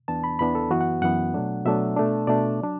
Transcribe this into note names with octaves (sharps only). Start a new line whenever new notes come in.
E2 E3 B3 D4 A5
B5
E2 E3 B3 D4 B5
A4
F#2 E3 B3 F#4
F#5
F#2 E3 B3 F#5
B2 F#3 A3 D4
B2 F#3 A3 D4 E5
B2 A3 D4
B2 A3 D4 D5
F#3 D4